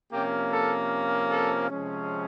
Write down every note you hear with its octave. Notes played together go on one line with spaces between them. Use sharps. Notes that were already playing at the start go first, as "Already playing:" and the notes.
C3 F3 A#3 C#4 G4
A4
A4
C3 F3 G#3 C#4